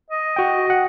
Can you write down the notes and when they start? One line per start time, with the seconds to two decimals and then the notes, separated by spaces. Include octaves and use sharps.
0.10 D#5
0.36 F#4 G5
0.70 F#5